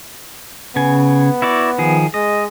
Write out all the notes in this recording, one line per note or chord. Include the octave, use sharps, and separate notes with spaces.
C#3 B3 G#5
E4 F#4 D5
D#3 F3 G#4
G#3 D#5